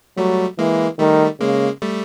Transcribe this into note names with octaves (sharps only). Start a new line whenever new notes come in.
F#3 G3 A3
E3 G#3 A#3
D#3 G3 A3
C#3 G#3 A#3
G3 A3